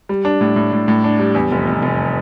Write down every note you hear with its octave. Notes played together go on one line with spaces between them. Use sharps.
G3
D4
A2
A2
A2
A2
D4
G3
E2
F1
F1
F1